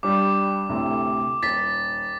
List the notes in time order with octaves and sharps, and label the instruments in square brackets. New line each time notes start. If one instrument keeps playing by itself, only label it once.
[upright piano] G2 G3 [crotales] D6
[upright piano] D2 A2 C3
[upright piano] D#1 [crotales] A6 B6